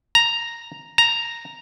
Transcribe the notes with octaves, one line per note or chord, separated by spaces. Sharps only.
A#5
A#5